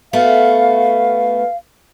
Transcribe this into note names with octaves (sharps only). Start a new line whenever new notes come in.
A3 B3 F#4 F5